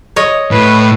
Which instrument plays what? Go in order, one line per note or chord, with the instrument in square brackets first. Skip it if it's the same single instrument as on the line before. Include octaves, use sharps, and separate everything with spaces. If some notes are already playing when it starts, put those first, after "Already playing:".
[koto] C#5 D#5
[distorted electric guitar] A2 [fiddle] B4